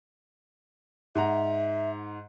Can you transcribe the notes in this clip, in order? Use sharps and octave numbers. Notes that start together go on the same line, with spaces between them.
G#2 E5 F#5 A#5